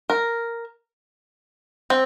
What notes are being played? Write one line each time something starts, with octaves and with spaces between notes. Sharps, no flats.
A#4
C4